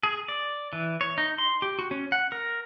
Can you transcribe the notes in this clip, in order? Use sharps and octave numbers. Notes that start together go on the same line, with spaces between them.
G#4
D5
E3
C#5
D#4
C6
G4
F#4
C#4
F#5
A#4